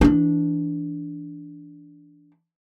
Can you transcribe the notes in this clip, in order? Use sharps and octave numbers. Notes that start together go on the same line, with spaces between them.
E3 D4